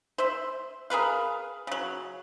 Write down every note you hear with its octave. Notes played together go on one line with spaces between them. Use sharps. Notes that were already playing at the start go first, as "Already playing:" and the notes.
C5 E5
G#4 A#4 B4 F5
C#3 F#3